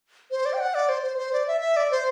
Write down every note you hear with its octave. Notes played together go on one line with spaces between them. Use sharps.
C5
D5
G5
F#5
D5
C5
C5
C5
D5
E5
E5
D5
C5